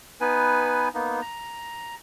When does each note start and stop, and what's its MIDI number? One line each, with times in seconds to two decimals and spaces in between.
0.21 0.89 59
0.21 0.89 63
0.21 0.89 71
0.21 0.89 80
0.94 1.21 58
0.94 1.21 59
0.94 1.21 63
1.22 1.95 82